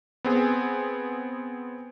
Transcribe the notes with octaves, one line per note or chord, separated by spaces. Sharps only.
B3 C4 G#4